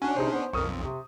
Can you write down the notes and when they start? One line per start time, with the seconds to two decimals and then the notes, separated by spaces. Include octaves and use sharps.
0.02 C#4 D4 F#4 G#5
0.16 C3 D#4 G#4 C5
0.32 B3 C5
0.53 B1 F2 A#4 C#6 D#6
0.69 C4
0.83 C3